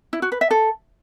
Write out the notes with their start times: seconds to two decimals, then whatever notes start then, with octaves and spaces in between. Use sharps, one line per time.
0.13 E4
0.22 F#4
0.32 B4
0.41 E5
0.51 A4